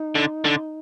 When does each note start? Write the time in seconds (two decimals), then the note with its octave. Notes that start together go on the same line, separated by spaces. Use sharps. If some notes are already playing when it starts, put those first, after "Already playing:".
Already playing: D#4
0.15 D3
0.45 D3